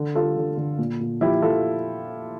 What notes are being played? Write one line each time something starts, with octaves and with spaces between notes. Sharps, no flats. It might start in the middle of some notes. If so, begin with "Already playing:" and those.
Already playing: D3
G3 F4 A4
D3
D3
A#2
A#2
F3 E4 G4
F3 F4 A4